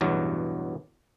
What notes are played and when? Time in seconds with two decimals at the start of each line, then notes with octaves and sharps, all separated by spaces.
0.01 A1 E2 G2 B2 F#3